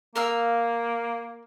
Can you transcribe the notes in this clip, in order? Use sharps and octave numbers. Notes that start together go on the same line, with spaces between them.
A#3 A#4 F5 E6